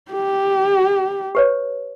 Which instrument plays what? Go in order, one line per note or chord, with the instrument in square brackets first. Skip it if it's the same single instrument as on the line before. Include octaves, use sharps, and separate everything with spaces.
[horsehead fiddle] G4
[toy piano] G4 B4 C#5